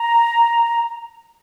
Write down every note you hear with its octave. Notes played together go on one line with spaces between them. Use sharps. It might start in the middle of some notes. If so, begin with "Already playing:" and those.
Already playing: A#5